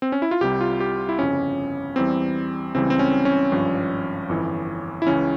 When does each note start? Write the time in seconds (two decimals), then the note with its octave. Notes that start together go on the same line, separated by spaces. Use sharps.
0.02 C4
0.12 C#4
0.22 E4
0.31 F4
0.41 C2 C3 G3 G4
0.61 F4
0.80 G4
1.09 E4
1.18 G1 F2 C#3 C#4
1.96 E2 E3 G3 C4
2.74 C#2 C#3 E3 G3 C4
2.90 C4
2.99 C#4
3.25 C#4
3.52 G#1 G2 F3
4.29 G1 F2 E3
5.02 E4
5.07 C#2 C#3 E3 C#4